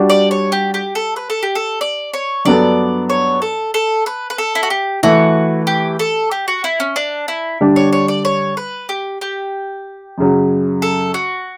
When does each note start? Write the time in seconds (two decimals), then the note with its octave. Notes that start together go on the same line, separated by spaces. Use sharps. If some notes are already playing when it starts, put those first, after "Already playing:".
Already playing: G3 D4 F#4
0.10 D5
0.31 C#5
0.52 G4
0.74 G4
0.95 A4
1.16 B4
1.30 A4
1.43 G4
1.55 A4
1.81 D5
2.13 C#5
2.45 G2 F#3 B3 D4 A4 D5
3.10 C#5
3.42 A4
3.74 A4
4.06 B4
4.30 B4
4.38 A4
4.55 E4
4.63 F#4
4.70 G4
5.03 E3 A3 E4 F#4
5.67 G4
5.99 A4
6.31 G4
6.48 F#4
6.64 E4
6.80 C#4
6.96 D4
7.28 E4
7.60 D3 G3 D4
7.76 C#5
7.93 C#5
8.08 D5
8.25 C#5
8.57 B4
8.89 G4
9.21 G4
10.18 F#2 C#3 F#3
10.82 A4
11.14 F#4